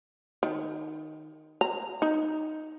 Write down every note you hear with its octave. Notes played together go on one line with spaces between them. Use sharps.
D#3
A#5
D#4